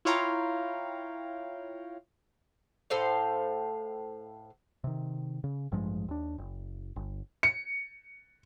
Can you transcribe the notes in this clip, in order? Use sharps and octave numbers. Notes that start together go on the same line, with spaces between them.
E4 F4 C#5 F5 G5 A#5
A2 A4 C5 F5
C3 D#3
C#3
A1 G2 F3 G#3
D#2 D4
F#1
G1
C#7